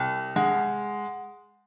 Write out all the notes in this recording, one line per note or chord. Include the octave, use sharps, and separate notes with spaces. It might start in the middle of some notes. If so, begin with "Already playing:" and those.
Already playing: C2 G5
G#3 F#5